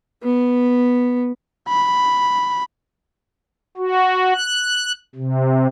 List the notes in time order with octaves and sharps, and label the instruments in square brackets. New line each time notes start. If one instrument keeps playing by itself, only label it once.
[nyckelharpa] B3
[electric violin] B5
[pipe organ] F#4
F#6
C3